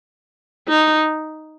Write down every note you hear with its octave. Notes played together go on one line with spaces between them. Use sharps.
D#4